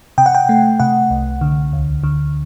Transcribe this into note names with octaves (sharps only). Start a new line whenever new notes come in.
C3 G5
F#5
G5
A3
C3 F#5
C2
D3
D2
D3